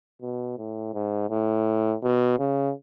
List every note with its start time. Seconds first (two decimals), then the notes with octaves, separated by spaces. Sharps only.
0.22 B2
0.58 A2
0.94 G#2
1.30 A2
2.03 B2
2.39 C#3